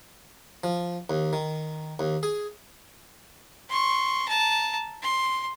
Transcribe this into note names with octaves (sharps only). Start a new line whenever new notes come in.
F3
D#2
D#3
D#2
G#4
C6 C#6
A5 A#5
C6